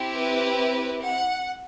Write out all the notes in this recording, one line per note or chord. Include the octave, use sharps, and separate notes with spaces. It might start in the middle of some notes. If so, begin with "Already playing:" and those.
Already playing: C4 E4 G4
B4
F#5